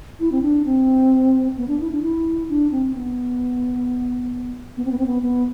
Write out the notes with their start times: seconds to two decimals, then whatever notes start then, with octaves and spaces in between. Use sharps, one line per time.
0.20 E4
0.32 C4
0.42 D4
0.65 C4
1.57 B3
1.68 D4
1.80 E4
1.92 D4
2.03 E4
2.49 D4
2.72 C4
2.94 B3
4.77 B3
4.85 C4
4.92 B3
4.98 C4
5.06 B3
5.23 B3